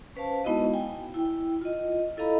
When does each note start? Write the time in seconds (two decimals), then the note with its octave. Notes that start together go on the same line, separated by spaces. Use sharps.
0.16 C#4 B4 C5 F5 A5
0.44 G#3 B3 D#4 E4 F#4 D#5
0.74 G5 G#5
1.14 E4 G5
1.61 F4 D#5
2.17 E4 A4 D#5 F5 A#5 B5